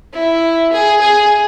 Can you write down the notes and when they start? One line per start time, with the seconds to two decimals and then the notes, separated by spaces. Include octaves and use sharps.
0.13 E4
0.72 G#4
1.01 G#4